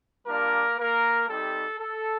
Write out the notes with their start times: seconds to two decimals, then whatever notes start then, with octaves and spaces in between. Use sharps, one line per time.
0.27 G3 A#3 D4 F4 A#4
0.78 A#3 A#4
1.29 G3 C4 D#4 G4 A4
1.79 A4